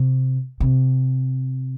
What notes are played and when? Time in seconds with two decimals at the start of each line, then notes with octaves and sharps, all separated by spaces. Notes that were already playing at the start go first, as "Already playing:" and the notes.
Already playing: C3
0.60 C3